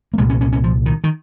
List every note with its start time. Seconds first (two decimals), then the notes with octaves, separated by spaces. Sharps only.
0.14 A#3
0.18 C2 A#2 G#3
0.30 C#4
0.41 C#4
0.52 C#4
0.64 F3
0.86 D#3
1.04 D#3